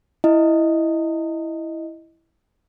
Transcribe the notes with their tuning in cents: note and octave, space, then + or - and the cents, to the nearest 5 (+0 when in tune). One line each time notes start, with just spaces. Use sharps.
E4 +0 D#5 +0